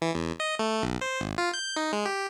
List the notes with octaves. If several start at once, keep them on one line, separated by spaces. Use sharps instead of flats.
E3
E2
D#5
A3
B1
C5
G#1
F4
G6
D#4
G#3
G4